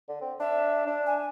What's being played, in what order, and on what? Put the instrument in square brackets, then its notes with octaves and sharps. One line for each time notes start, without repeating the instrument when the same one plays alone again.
[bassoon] D3
C4
[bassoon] D4 [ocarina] E5
[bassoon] D4
[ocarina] G#5